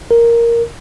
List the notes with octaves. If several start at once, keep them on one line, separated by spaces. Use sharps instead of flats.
A#4